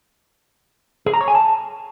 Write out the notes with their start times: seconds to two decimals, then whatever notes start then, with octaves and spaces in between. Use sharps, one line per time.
1.06 G#4
1.14 A#5
1.21 C#5
1.28 G#5
1.35 A5